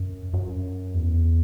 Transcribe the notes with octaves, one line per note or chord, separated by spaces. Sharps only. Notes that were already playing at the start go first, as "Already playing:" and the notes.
Already playing: F#2
F#2
E2